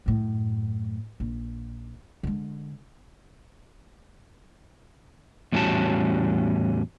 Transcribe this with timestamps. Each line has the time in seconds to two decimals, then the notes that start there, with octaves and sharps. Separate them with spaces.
0.06 F#2 A2
1.20 A#1
2.23 D3 G#3
5.52 E2 A2 G3 C#4 F#4 A5